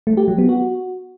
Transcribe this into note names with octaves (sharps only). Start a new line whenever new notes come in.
A3
G4
F#3
B3
F#4